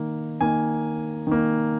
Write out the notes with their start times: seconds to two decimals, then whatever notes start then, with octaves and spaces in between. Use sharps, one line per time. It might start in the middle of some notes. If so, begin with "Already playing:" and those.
Already playing: D#3 A#3
0.41 D#3 A#3 G#5
1.27 D#3 A#3